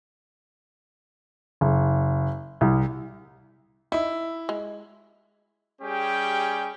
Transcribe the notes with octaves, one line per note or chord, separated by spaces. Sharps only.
F#1
C2
D#4 E4 E5
G#3
G3 C#4 G4 G#4 G5